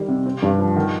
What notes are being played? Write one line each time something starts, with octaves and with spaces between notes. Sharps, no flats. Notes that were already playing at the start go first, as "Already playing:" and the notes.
Already playing: D#3 G3
C3
C4
G2
F3
D#3